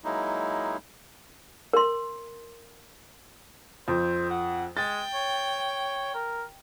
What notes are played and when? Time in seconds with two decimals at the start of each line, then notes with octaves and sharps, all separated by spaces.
0.04 F#3 G#3 A#3 D#4 E4
1.73 A#4 C6
3.88 F2 C5
4.30 F#5
4.77 G#3 G5 A6
5.14 C#5
6.15 A#4